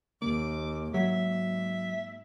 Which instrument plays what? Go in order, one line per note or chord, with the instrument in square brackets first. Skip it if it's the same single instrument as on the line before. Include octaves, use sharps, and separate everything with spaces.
[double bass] D#2 [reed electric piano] A#3 [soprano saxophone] D6
[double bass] G#2 [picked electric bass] F#3 [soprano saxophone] E5